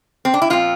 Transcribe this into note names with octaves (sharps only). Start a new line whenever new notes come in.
C4
D4
E4
A#2 F3 C4 F4